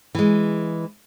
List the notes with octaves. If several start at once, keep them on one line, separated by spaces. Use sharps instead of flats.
E3 G#3